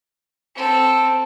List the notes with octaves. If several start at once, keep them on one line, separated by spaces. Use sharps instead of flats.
C4 A4